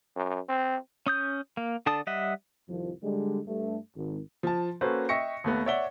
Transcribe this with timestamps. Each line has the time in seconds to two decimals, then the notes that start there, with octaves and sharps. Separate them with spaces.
0.16 F#2
0.49 C4
1.06 C#4 D#6 G6
1.57 A#3
1.86 D3 D4 A4 A5 D#6
2.07 G3 D#5 E5 F#5
2.68 C2 F2 D#3 F3
3.02 D3 G3 G#3
3.46 G2 A3
3.95 G#1
4.43 F3 A5
4.81 A#3 C#4 F#4 A4 B4 C5
5.09 D#5 E5 G5 C#6 A#6 C#7
5.44 D#2 A3 B3
5.66 C#5 D5 E5 F#5 G7